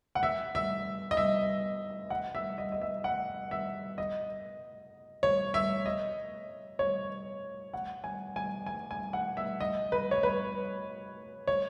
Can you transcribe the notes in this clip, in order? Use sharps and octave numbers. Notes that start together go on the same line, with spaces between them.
F#5
E5
E5
D#5
E5
F#5
E5
D#5
D#5
E5
F#5
E5
D#5
C#5
E5
D#5
C#5
F#5
G#5
G#5
G#5
G#5
F#5
E5
D#5
B4
C#5
B4
C#5